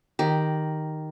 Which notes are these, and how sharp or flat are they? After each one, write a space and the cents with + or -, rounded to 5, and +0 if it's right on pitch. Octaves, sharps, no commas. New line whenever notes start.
D#3 +0 G4 +0